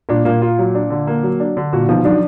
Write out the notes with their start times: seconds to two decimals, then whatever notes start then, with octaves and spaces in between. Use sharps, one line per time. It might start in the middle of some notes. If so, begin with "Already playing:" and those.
0.09 A#2 D4
0.25 A#2 A#3
0.42 F4
0.58 F#3
0.75 D4
0.90 D3
1.07 A#3
1.23 F#3
1.40 D4
1.57 D3
1.73 A#2 F#4
1.89 B2 D#3 F3
2.05 D#3 F#3 D4